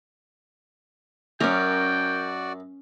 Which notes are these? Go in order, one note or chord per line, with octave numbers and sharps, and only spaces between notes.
F#2 C#4 F#4 A#4 D5 G5